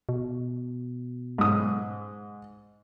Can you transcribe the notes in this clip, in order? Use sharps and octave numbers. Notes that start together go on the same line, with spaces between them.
B2
G#2 D#6